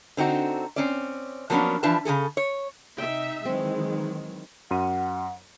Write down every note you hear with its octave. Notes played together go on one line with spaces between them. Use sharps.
D3 C4 D#4 F#4
C4 C#4 D5
F3 F#3 A#3 B3 C#4 D4
E3 F3 D4 B4 A5
C#3 E3 G#4 A4
C#5
C3 D#4 E5 G5
D#3 E3 F#3 G#3 C4
F#2 F#5 C6 D#7